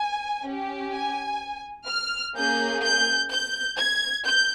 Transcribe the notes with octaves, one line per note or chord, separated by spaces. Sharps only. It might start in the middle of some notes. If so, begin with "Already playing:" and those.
Already playing: G#5
C#4 G4
G#5
F6
A#3 C#4 G#4 G6
G6
G6
G#6
G6